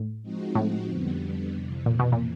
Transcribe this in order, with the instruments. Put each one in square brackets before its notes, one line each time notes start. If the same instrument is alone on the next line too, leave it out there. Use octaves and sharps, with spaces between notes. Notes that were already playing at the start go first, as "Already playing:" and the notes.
Already playing: [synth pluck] A2
[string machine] F3 G#3 C4 D#4 F#4
[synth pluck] A2
[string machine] F2 D3 G3 B3
F2 C3 E3
[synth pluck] A#2
B2
A#2